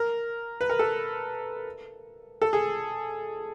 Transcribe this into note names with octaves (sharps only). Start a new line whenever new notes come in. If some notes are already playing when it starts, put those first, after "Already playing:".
Already playing: A#4
B4
A#4
A4
A4
G#4